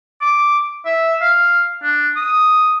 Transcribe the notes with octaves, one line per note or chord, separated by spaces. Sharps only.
D6
E5
F5
D4
D#6